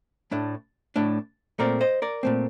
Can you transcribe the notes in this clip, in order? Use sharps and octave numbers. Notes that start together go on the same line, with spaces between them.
A2 A3 D4
A2 A3 D4
A#2 A3 C4 A#4 D5
C5 D#5
A#4 D5
A#2 A3 C4